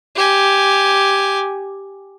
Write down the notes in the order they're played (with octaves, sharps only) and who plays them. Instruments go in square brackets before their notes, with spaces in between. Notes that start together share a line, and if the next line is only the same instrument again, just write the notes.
[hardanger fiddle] G4 G#5